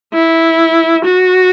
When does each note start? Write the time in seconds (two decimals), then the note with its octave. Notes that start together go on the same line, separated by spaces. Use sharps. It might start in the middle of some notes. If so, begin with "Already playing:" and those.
0.14 E4
1.05 F#4